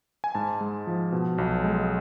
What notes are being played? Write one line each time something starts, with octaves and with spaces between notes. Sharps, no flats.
G#5
G#2 A5
G#3
F3
B2
B1
G#3